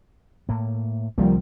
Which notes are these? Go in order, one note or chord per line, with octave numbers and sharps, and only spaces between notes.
A2 A#3
C2 D#3 F3 G3 A#3 C4